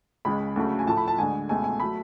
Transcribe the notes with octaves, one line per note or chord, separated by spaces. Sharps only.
C#2 C#3 G#3 B5
D2 C#3 F#3 A3
G#5
A2 F3 A3 A5
B5
A5
D2 D3 G#3 G#5
C#2 B2 A3 G#5
G#5
F#3 A3 B5